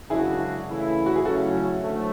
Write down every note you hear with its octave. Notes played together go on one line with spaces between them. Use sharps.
F#2 C#3 G#3 D4 E4 F#4 G#4
C#3 E3 A3 E4
F#4
G#4
C#3 F#3 A3 C#4 E4 F#4 A4
D2 F#3 A3